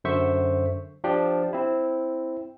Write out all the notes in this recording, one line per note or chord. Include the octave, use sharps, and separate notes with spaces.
F#2 D3 C5 E5 C#6
F3 D4 G4
C4 E4